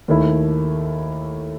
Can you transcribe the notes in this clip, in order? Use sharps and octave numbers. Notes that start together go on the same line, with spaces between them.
D#2 D#3 A3 E4